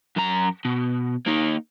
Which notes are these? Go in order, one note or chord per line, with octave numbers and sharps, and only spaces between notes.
F#2 A#5
B2
A#3 D#4